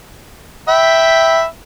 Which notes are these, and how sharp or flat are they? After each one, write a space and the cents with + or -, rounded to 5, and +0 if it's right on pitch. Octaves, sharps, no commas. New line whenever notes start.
E5 -5 G5 +0 B5 +0